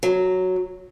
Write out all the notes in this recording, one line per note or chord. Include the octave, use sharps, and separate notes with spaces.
F#3